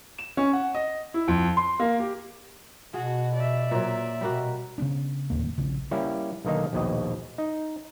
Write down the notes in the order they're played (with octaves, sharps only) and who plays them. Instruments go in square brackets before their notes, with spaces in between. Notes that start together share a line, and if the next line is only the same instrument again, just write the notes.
[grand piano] E7
C#4
F#5
D#5
E4
F2
C6
A#3
G4
[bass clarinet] B2 [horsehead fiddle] F#4 [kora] G#4
[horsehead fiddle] D5 E5
[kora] A#2 F#3
[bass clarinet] B2 [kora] G3 A#3 F#4
[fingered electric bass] C#3 F#3 B3 D4
D1 A#1 D#2 A#3
A#1 C#3
[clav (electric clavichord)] G3 A#3 C#4 E4
B1 D3 D#3 A#3 D#4
A#1 D#2 B2 D#5
D#4